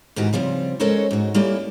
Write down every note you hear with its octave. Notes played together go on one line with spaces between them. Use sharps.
G#2 D#3 E3 F#4 G4
C#3 F3 G3 C4
G#3 C#4 A4 A#4 C5 C#5
G#2 F#4
G3 A#3 C#4 E4 G4 A4